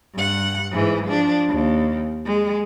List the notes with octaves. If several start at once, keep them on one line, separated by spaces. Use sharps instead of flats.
G2 F#5
G#2 E3
F3 D4
D#2
G#3